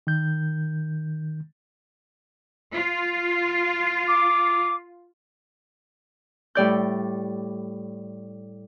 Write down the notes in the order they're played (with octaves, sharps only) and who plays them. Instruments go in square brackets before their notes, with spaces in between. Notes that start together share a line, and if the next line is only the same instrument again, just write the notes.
[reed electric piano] D#3 G6
[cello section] F4
[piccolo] D6
[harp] A2 G3 D5 G6